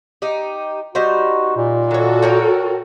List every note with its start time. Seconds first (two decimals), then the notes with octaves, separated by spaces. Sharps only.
0.22 D#4 G4
0.95 G3 D#4 F#4 C5
1.57 A#2
1.91 D#3 F#4 A4 C#5
2.22 A#4 C#5 G5